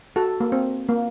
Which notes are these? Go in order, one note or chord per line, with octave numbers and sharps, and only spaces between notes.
F#4 A4
A#3
C4
A#3